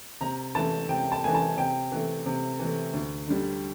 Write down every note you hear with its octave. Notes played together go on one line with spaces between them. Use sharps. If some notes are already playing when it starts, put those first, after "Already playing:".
C3 A#5
E3 A3 A5
C3 G5
A5
E3 A3 G#5
A5
C3 G5
E3 A3
C3
E3 A3
D2
D3 G3